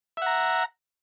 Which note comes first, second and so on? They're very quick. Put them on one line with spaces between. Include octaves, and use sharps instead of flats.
E5 F#5 A#5